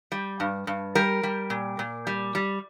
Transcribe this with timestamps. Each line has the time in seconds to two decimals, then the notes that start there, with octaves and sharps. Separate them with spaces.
0.12 G3
0.40 G2
0.67 G2
0.95 G3 A#4
1.23 G3
1.50 A#2
1.79 A#2
2.07 G3
2.35 G3